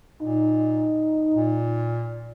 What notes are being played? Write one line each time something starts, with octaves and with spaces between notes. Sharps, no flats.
A#2 D#4
A#2